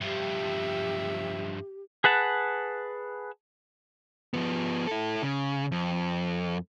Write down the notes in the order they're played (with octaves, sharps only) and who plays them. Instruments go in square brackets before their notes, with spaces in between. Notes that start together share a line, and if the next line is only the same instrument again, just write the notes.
[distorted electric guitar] G2 F3 [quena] G4 [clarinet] E5
[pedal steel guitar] G#4 B4 F#5 A5
[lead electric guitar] F3 B3
E4 A4
C#3
F2